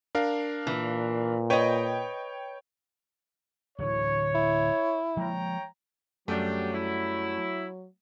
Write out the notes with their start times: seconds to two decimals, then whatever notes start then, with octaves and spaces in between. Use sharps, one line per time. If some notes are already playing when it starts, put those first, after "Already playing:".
0.15 D4 A#4 F5
0.67 A#2 E3
1.50 B4 C#5 D#5 G5
3.78 D1 D3 E3 C#5
4.35 E4
5.17 F3 G#3 A#3 C#5 G5 A#5
6.28 F#2 F#3 G3 A3 D4 G4
6.74 E4